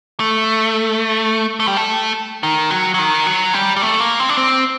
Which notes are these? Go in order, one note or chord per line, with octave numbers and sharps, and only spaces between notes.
A3
A3
G3
A3
D#3
F#3
F#3
D#3
F#3
G3
G3
A3
A#3
C4
D4
C4